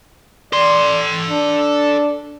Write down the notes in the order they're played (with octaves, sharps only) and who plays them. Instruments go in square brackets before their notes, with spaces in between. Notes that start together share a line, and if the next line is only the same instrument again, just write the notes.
[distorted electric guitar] A4 C6 [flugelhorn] D5
[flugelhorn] D4